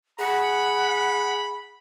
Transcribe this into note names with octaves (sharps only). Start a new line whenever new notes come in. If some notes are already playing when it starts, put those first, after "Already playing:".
G#4 F#5 B5